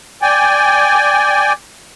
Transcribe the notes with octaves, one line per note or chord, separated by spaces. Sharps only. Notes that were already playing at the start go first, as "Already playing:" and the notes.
D5 G5 G#5